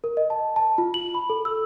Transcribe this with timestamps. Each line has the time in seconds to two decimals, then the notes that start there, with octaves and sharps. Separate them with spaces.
0.04 A#4
0.17 D#5
0.30 A5
0.56 A5
0.78 F4
0.94 F#7
1.15 B5
1.30 A4
1.45 E6